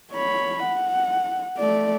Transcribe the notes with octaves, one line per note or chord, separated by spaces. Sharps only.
C#5 B5
F#5
A3 D5